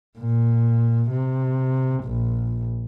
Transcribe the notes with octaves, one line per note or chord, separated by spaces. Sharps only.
A#2
C3
A#1